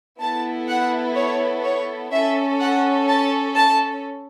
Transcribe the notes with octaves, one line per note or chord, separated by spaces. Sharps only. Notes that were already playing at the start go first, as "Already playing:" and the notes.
B3 E4 A4 A5
F#5
C#5
C#5
C#4 A4 E5
F#5
A5
A5